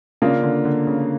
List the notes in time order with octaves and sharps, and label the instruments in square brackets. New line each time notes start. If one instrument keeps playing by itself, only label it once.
[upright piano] C#3 [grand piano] A#3 D4 F4
[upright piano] D3
D3
C#3